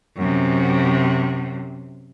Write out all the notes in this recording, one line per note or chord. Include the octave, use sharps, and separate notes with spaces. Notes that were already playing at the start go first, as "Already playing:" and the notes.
F#2 C3